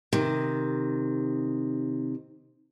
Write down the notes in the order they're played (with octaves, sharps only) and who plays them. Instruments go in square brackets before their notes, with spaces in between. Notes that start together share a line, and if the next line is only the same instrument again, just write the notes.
[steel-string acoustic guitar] C3 D#3